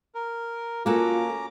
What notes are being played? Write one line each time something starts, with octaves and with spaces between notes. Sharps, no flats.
A#4
A#3 C#4 F4 F#4 A4 A#5 D6